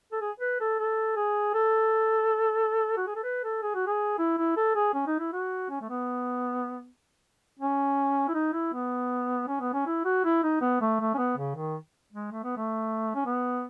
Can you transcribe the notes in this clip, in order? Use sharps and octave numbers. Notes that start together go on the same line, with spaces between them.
A4
G#4
B4
A4
A4
G#4
A4
F#4
G#4
A4
B4
A4
G#4
F#4
G#4
E4
E4
A4
G#4
C#4
D#4
E4
F#4
C#4
A3
B3
C#4
E4
D#4
E4
B3
C#4
B3
C#4
E4
F#4
E4
D#4
B3
A3
A3
C#4
B3
C#3
D#3
G#3
A3
B3
A3
C#4
B3